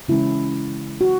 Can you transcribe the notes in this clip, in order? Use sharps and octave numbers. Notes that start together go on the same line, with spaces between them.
C#3 E3 G#3 C#4 E4
F#4